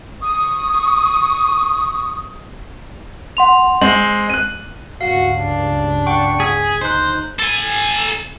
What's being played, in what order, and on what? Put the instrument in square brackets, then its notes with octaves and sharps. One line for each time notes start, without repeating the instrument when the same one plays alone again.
[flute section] C#6 D#6
[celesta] F#5 C6 F7
[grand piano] G#3 C4 [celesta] F#7
[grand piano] F#6 D#7
[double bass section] C#2 G2 [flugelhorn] F#4 [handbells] F5
[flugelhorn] D4
[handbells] F#5 G5 C#6
[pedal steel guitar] G#4 [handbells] B6
[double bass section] D2 [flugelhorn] D#4 [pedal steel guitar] C5 [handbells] F#6 G6
[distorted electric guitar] A4 G#5